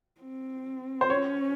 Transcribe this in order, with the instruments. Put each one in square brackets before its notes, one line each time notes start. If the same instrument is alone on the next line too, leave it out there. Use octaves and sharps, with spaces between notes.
[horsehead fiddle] C4
[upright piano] C5
[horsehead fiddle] C#4 [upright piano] C#5